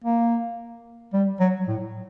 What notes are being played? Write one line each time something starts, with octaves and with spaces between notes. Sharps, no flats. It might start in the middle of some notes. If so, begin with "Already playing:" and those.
A#3
G3
F#3
A2